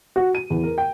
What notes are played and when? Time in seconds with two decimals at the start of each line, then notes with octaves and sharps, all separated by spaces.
0.16 F#4
0.35 D#7
0.50 E2
0.63 A#4
0.78 G5